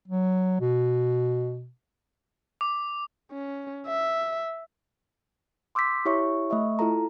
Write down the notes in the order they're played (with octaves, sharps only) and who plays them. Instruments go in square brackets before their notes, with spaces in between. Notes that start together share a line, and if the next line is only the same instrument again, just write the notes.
[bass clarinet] F#3
B2
[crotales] D6
[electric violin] C#4
E5
[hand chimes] C6 D6 E6 G6 B6
E4 G4 C#5 E5 C#6
A3 D#5 E5 C#6
E4 F4 A4 A#5